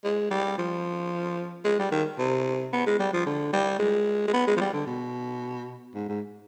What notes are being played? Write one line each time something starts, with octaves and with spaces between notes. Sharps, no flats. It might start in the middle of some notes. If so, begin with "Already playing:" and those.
G#3
G3
F3
G#3
G3
D#3
C3
B3
G#3
G3
F3
D3
G3
G#3
G#3
B3
G#3
F3
G3
D3
B2
G#2
G#2